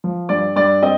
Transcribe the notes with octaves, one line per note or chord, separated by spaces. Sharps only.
F3
G2 D5
G2 D5
C4 D#5